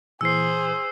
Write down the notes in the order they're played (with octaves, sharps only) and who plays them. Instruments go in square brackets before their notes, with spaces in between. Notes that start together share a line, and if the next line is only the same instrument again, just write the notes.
[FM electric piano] A#2 E3 [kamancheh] G#4 C5 [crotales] E6 C7